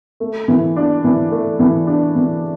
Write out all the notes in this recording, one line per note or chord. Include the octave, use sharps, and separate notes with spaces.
A3
E3
D4
E3
A3
E3
D4
E3